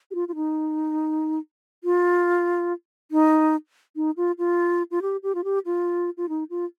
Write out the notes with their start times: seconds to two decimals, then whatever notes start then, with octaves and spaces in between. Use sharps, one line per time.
0.11 G4
0.15 F4
0.28 F4
0.35 D#4
1.84 F4
3.11 D#4
3.96 D#4
4.17 F4
4.38 F4
4.91 F4
5.02 G4
5.23 G4
5.35 F4
5.44 G4
5.66 F4
6.17 F4
6.29 D#4
6.50 F4